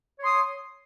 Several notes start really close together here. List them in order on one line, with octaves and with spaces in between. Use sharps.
C#5 C6 D#6